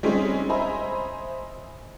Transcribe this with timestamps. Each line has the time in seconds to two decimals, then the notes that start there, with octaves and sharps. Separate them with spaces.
0.03 G3 G#3 C4 C#4 D#4
0.49 C5 D#5 E5 G#5 A#5 B5